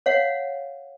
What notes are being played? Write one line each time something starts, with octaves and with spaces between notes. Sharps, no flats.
C#5 F5 F#5